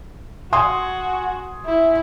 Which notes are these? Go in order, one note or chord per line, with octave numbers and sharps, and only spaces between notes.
F#4 G#5 C6 D#6
E4